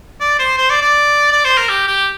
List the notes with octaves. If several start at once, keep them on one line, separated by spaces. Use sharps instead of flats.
D5
C5
C5
D5
D5
D5
C5
A#4
G4
G4